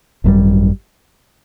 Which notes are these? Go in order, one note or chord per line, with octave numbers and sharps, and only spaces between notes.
G#1 F#2 D3 G3